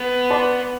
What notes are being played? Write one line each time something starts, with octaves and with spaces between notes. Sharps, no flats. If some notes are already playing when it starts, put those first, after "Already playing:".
Already playing: B3
B4 D5 A5 C6